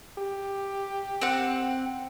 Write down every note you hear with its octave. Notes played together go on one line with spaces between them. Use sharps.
G4
C4 F#5